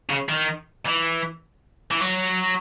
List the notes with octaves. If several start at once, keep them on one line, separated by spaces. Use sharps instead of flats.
C#3
D#3
E3
E3
F#3